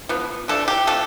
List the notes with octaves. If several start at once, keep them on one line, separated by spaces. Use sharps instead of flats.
D3 F3 B3
D3 F3 A3 D4 A4
G4
C3 F3 A3 A4